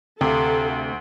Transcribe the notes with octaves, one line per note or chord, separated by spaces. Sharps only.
D2 C3 A4 F5